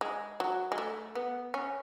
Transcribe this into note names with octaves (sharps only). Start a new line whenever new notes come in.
G#3
F#3
G#3
A3
B3
C#4